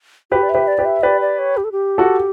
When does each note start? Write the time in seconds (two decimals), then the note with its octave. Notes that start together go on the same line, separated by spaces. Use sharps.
0.32 F#4 G4 B4
0.42 D5
0.49 E5
0.55 G4 B4
0.68 D5
0.78 G4 B4
0.85 E5
1.03 G4 B4 D5
1.21 D5
1.39 C#5
1.57 G4
1.64 A4
1.72 G4
1.98 F#4 A4